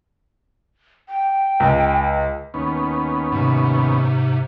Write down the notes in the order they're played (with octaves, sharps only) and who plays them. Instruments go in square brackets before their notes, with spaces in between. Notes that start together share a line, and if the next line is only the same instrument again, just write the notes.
[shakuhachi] G5
[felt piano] C#2
[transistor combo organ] D#2 B3 C#4
[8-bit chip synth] G#2 C3